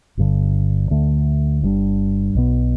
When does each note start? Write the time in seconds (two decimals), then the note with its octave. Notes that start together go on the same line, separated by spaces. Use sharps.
0.17 G1 G2 D3
0.90 D2 D3 A3 D4
1.63 G1 G2 G3 D4
2.35 B1 B2 B3